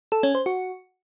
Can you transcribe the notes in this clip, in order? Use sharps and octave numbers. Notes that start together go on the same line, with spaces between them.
A4
C#4
C5
F#4